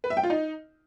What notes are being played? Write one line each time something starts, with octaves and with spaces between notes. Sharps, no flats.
B4
E5
G5
F4
D#4